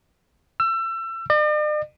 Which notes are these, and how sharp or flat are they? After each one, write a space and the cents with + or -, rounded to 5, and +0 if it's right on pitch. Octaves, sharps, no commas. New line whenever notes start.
E6 +30
D5 +45